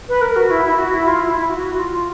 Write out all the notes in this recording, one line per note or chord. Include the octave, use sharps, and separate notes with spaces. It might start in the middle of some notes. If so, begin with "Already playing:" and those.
B4
A#4
F#4
E4
E4
F#4
E4
F4
E4
E4
F#4
F#4
F4
F4